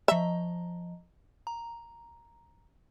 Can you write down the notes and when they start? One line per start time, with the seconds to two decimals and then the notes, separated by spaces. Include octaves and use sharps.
0.08 F3 D#5 E5 A#5
1.47 A#5